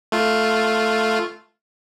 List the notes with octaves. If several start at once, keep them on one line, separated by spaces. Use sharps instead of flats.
A3 F4